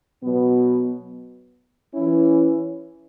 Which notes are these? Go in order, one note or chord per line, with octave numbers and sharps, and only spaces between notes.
B2 F#3 B3
E3 C#4 E4